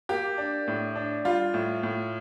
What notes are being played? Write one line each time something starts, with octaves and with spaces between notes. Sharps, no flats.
A#3 G4
D4
A2
D4
G3 F4
A2
A2